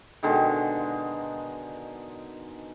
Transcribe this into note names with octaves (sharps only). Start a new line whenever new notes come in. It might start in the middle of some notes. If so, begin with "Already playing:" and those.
B2 D3 D#3 G#3